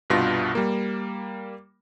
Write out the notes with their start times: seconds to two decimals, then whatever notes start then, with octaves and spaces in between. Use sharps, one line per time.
0.10 C2 G2 B2 F4 A#6
0.55 G3 A#3